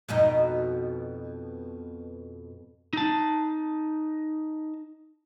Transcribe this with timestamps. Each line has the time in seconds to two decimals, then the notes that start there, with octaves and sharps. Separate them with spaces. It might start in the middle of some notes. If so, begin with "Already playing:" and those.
0.09 F2 B2 D#4
2.93 D#4 A5